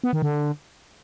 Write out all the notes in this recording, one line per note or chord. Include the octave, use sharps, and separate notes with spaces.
B3
D#3
D3